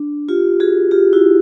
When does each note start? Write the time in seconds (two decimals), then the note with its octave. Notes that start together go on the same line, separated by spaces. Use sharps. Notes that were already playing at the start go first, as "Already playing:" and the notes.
Already playing: D4
0.29 F4 G4
0.60 F#4 G#4
0.91 F4 G4
1.13 E4 F#4